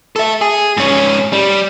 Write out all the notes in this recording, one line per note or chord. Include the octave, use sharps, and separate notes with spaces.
A4 E5
G#4
G#2 C#4
G3